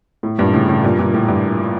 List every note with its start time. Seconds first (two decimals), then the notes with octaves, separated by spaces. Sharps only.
0.23 A2
0.38 G2 A#2
0.53 A2 C#3
0.69 A2 C#3
0.84 G2 A#2
0.99 G2 A#2
1.14 A2
1.28 G2